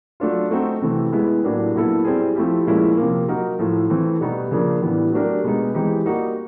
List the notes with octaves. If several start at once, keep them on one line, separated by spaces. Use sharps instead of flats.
F#3 A3 D4 F4
A3 C4 D#4 F#4
C3 E3 A3 C4
G#3 B3 E4
A2 F#3 A#3 D4 G4
A#2 F#3 B3 E4 A4
G3 C4 E4 G#4
F3 A3 C4 E4 G4
A#2 F3 G#3 C#4 E4
C3 F3 A#3
F#3 A#3 D#4 F#4 A#4
A2 F3 A3
E3 A3 C4
B2 G3 B3 D#4
C#3 F3 A#3 D4
A2 E3 G3 B3
F#3 A3 D4 G4 A#4
B2 G#3 B3 D#4
E3 G#3 C4 D#4 G4
G3 A#3 D#4 F#4